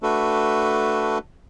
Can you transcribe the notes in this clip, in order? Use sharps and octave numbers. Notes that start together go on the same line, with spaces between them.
A3 D4 F#4 A4 B4